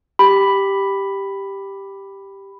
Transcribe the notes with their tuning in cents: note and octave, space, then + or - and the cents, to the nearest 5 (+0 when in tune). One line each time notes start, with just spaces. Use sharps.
G4 +0 B5 +0